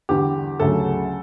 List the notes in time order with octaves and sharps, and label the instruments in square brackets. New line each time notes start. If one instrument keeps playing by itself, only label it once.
[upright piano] E2 D3 G3 G4
D2 C#3 F#3 A4